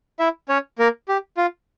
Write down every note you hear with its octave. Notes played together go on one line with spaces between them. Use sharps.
E4 E5
C#4 C#5
A#3 A#4
G4
F4